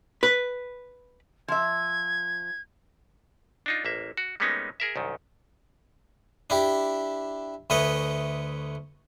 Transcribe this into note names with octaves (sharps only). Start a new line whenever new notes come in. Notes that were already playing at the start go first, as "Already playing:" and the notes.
B4
F3 E5 G#6
D4 D#4 F4
A1 A#3 E5
F#4
G3 G#3 A#3 B3 C#4 D#4
G#4 A#4 E5
C2 F#2 D#3
D4 E4 G4
D2 A3 B4 C#5 D#5